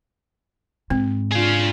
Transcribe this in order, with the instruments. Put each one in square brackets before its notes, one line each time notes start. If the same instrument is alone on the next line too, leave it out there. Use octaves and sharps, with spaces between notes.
[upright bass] G#2 [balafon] C4
[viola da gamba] D4 F4 [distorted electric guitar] G#4 F5